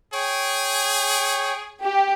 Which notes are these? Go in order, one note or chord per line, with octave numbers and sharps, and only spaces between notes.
G#4 C#5 G5
G4